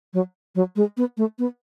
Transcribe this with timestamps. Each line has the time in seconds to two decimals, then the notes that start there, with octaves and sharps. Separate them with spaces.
0.14 F#3
0.55 F#3
0.76 G#3
0.97 B3
1.17 A3
1.39 B3